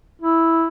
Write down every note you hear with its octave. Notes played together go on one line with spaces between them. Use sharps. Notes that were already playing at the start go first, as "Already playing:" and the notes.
E4